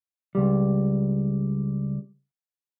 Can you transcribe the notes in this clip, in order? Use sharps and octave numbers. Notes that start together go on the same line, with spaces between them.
C#2 G3